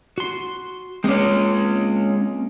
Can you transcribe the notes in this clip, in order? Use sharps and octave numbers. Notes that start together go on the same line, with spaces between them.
F#4 C6
G#3 A#3 C4 C#4